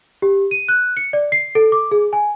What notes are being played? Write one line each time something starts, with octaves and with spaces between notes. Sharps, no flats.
G4
D#7
F#6
C#7
D5
C7
A4
D6
G#4
G#5